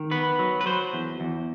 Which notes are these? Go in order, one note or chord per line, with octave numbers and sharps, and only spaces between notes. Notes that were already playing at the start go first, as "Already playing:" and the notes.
Already playing: D#3
B3 B4
F#3
B4
F#3 C5
E2
E2